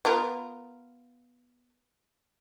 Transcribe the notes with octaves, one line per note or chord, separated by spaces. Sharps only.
B3 F4 A#4